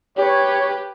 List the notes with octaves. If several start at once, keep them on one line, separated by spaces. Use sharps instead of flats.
G4 B4 C#5